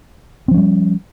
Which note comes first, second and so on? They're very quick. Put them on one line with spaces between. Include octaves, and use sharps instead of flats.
C4 F3 C#4 G3